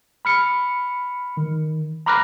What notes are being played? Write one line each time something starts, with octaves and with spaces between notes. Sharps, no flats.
B5 F6 C#7
D#3
A#5 B5 D6 F6 F#6 A#6